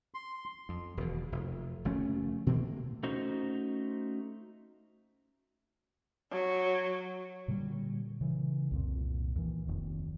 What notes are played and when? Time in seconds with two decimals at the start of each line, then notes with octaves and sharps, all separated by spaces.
0.14 C6
0.69 F2
0.97 E1 D#2 B2
1.32 F1
1.85 F#1 F3 A3 C#4
2.47 B2 E3 A3 A#3
3.03 A3 C#4 D#4 F#4 C5
6.30 F#3
7.48 A#2 D3 D#3 G3
8.21 C#3 E3
8.71 C2 F2 A#2
9.36 D#2 E3
9.67 F1 D#2